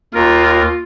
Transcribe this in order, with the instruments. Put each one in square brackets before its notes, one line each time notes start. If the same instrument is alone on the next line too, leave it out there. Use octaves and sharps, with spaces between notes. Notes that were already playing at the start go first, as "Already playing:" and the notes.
[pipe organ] D#2 A#4 [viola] F4